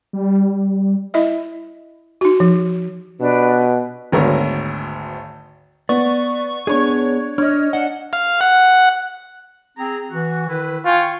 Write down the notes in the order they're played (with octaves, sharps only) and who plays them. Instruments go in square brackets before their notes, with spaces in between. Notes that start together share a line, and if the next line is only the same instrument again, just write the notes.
[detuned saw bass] G3
[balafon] E4 D#5 E5
D#4 F#4
F3
[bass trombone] B2 [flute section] D4 G4 B4
[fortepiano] G#1 D2 B3 A#4 C#5
[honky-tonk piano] B3 [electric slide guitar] D5 [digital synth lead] C#6
[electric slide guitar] B3 G#4 [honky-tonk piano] D4 C#5
[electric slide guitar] D4 [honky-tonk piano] C#5 D#5 [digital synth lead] F6
[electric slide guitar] D4 D#5 [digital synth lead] F#5
[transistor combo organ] F5
F#5
[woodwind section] C4 G#4 A#5
E3 F#4
D#3 E4 B4
[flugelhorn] F4 [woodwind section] G5 G#5 C#6